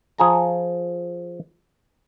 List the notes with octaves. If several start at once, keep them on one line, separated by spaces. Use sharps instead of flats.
F3 G#4 A#5